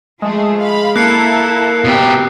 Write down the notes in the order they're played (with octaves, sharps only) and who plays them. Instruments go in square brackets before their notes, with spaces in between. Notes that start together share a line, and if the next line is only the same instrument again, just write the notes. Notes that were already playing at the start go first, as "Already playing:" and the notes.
[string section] F3 A3 G#4 [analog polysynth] G#3
[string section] F5 B5
[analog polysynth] A#3 [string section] E4 A4 A#4 [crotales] F#6 C7 C#7
[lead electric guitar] B2 G4